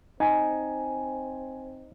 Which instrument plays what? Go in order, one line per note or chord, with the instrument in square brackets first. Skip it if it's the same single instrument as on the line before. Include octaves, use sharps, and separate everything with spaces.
[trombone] C4 [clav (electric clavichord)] D#4 [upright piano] G#5